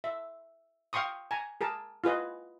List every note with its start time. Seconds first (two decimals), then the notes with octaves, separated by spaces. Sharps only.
0.04 E5
0.93 F5 G5 C6 C#6 D#6
1.31 G#5 A#5
1.61 G#4 A#4 A5
2.04 F4 G#4 B4 D#5